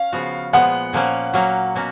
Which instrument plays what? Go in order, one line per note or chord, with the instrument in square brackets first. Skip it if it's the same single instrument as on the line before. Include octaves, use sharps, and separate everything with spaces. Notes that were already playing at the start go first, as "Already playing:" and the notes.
Already playing: [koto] C#4 [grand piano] F5
[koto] C#3 F3 B3 F#4
[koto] A#2 F3 G#3 B3 [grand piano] F#5
[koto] A#2 F3 A#3 C#4
F#3 A#3 C#4
B2 A#3 C#4 F#4